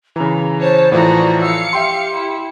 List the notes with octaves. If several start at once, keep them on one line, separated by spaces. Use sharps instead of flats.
C#3 E3 A#5
C5 C#5 A5
A2 E3 F3 F#4 D5 A#5
F5 E6 C#7
G4 E5 G5 C6
E4